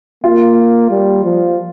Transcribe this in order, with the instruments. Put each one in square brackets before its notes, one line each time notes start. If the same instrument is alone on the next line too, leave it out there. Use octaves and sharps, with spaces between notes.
[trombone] A#3 [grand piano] F4
[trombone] G3
F3